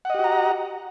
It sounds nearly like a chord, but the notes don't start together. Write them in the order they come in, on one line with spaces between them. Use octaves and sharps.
F#5 D#5 G4 F#4 A#5